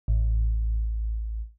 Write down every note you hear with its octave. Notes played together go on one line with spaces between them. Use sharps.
A1